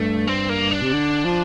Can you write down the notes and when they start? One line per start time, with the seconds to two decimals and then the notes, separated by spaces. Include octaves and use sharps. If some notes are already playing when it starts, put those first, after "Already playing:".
Already playing: G2 A3
0.27 C4
0.49 A#3
0.71 D4
0.82 C3
0.93 D3
1.25 F3